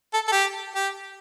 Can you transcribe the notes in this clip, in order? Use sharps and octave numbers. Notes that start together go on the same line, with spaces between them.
A4
A4
G4
G4